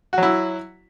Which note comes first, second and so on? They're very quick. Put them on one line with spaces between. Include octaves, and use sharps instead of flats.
F#4 F#3 E4